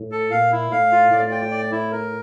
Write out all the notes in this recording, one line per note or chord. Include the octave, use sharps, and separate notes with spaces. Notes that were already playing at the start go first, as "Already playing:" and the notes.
Already playing: A2
A4
A#2 F5
E4
A2 F5
F4
A2 D5
G5
D5
E4
A#4